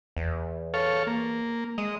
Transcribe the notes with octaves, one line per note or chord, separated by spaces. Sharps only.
E2
A4 C#5 F5
A#3
G#3 D#5